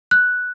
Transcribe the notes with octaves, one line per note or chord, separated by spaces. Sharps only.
F#6